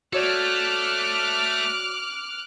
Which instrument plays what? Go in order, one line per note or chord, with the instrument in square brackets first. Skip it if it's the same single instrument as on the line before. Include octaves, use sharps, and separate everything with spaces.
[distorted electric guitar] A3 A4 [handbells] F#4 C#5 D5 [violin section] D6 F6 F#6